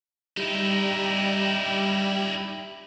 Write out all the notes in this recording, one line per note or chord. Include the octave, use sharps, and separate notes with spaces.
G3 D#4 E4